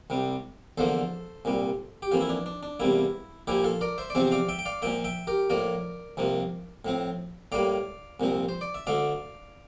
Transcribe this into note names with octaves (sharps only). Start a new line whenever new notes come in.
C2 C3 G3
E2 D3 F3 A#3 A4 C5
C2 A#2 G3
G4
F2 E3 A#3 F4
E4
D4
D4
D4
E2 C3 G3 A#3 E4
A#2 F3 A#3 E4 G4
F4 A4
A#4 D5
C5 E5
D5
E2 C3 F3 C4 C5 E5
D5 F5
E5 G5
G5
D5 F5
A#2 F3 A#3 E5 G5
E5 G5
G4 A#4
A2 F3 A#3 A#4 D5
C2 C3 F3 A#3
A2 F3 C4
A2 G3 A#3 D5 F5
C2 A#2 F3 C4
C5
D5
E5
D2 D3 A3 D5 F5